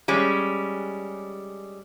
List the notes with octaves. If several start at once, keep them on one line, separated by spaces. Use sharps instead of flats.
G3 G#3 C#4